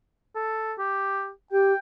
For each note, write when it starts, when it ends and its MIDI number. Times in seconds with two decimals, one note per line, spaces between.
0.35 0.73 69
0.78 1.30 67
1.52 1.73 67
1.52 1.79 79